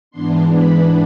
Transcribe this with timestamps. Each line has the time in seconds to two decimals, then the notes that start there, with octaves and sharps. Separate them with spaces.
0.11 G#2 E3 B3 D4 C6
0.52 B5